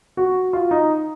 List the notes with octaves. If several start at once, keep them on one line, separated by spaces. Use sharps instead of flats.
F#4
F4
D#4